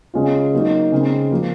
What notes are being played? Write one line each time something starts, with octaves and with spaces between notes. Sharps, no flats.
C#3 G#3 C#4 F4
F#3 A#3 D#4
C#3 G#3 C4
F3 A#3 F4